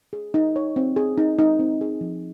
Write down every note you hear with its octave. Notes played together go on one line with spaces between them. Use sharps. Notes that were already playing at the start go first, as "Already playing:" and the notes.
G#4
D#4
C#5
C4
G#4
D#4
D#4
C4
G#4
F3